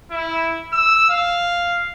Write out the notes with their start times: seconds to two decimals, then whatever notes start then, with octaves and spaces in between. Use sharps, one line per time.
0.11 E4
0.73 E6
1.10 F5